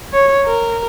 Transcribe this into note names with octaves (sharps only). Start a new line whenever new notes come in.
C#5
A#4